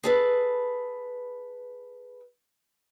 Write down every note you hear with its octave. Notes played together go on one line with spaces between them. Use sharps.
G#4 A4 B4